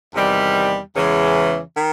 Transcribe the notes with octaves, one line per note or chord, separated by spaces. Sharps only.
E2 C3 D#3 G3
E2 C#3 E3 G#3
D#3